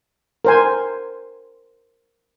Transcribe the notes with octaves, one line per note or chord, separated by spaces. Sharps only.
A#4 C5 G#5